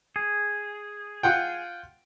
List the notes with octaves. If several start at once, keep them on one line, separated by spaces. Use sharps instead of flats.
G#4
F4 F#5 G5